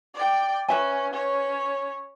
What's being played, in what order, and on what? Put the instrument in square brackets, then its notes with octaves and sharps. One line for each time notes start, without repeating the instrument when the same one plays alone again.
[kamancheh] D5 G5
[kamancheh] C#4 [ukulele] B4 E5 G#5
[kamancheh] C#4 C#5